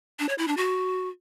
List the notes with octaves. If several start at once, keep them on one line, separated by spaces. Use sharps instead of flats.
D4
C#5
E4
D4
F#4